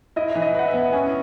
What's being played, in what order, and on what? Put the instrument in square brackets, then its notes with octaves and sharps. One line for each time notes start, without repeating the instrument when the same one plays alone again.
[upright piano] E4 [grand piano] D#5
[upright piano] E3
[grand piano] D#5
[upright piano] B4 [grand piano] F#5
[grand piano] E5
[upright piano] B3
[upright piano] C#4 [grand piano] G#5